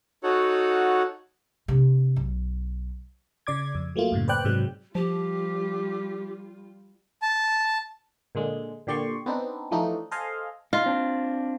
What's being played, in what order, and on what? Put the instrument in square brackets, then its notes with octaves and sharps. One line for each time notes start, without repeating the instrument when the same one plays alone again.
[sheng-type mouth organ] D#4 F#4 A4 C#5 F#5
[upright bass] C3 D4
B1
[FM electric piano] C#3 D5 D6 G#6
F2
F#3 A3 A#3 F4
F#2 A2 C#3
B4 C5 D5 G5 F#6
G#2 C3 F#3 G#3
[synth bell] F3 [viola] G3 F4 [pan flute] G4
[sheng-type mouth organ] A5
[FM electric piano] A#2 D3 G#3
A#2 D3 G4 D5 C6 C#6
B3 C4 D4 D#4
E3 F3 A3 D4 D#4
A4 C5 D#5 F5 G#5
[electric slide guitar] D#4 [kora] F4
[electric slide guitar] C4 D4